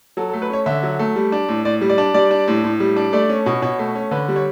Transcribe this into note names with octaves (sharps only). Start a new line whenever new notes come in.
F#3 A4
A4
A3
B4
C#4 C#5
D3 E5
F#3
A3
G3
D4
A2
A2 D5
G3
D5
D4
G3 D5
D4
A2
A2
G3
D4
A3 D5
C#4
B2
B2 C#5
A3
C#4
D3 B4
G3
C#5